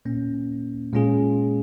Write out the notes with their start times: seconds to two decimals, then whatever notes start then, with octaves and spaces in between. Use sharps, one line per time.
0.05 A#2 A#3 C#4
0.93 A#2 G#3 C#4 F4 G#4